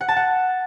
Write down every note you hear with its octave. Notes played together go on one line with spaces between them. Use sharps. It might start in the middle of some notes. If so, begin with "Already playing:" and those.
F#5
A5
F#5